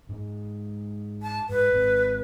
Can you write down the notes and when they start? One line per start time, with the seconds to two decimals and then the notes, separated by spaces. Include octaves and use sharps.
0.09 G#2 G#3
1.22 A5
1.49 G#2 B4
1.73 G#1 G#2